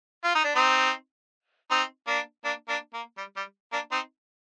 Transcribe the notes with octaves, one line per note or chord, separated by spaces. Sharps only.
F4
D#4
D4
C4 D#4
C4 D#4
A#3 D4
A#3 D4
A#3 D4
A#3
G3
G3
A#3 D4
C4 D#4